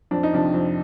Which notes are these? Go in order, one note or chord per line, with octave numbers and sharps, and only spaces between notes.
F2 D4
D#4
C3 F3 D4
F2